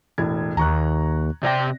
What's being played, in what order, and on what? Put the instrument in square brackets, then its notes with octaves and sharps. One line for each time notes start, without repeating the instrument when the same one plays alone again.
[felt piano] E1 A2 G#6
[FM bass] D#2 [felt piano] A#5 C#6 F#6
[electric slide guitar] C3 C#5 G5 [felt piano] D5 A#6